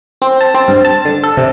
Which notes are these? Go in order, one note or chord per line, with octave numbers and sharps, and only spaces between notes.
C4
A5
C4
G2
A5
D3
A4
C3